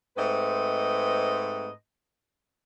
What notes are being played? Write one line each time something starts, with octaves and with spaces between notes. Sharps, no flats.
G#2 A3 C4 B4 D#5